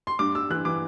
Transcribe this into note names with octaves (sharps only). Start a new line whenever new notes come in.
C6
G2 D6
G2 E6
E3 F#6
E3 D6